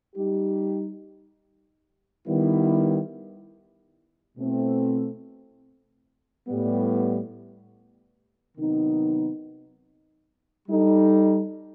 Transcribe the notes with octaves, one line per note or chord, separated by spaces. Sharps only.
G3 D#4 G4
D#3 G3 B3 E4
B2 A3 C4 E4
A2 G3 B3
C3 D#3 F#3 B3 D#4
G3 D#4 A4